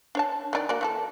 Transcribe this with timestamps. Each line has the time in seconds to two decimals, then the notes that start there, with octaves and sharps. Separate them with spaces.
0.15 D4 C#5 A5
0.53 D#3 D#4 D5
0.69 A#3 F#4 D5
0.81 E3 F#4 A4